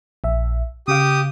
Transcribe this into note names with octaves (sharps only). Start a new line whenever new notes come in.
A#1 E5
C#3 G4 F5 D#6